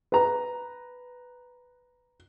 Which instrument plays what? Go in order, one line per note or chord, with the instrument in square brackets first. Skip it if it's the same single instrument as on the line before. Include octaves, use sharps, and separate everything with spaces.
[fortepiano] B4 A#5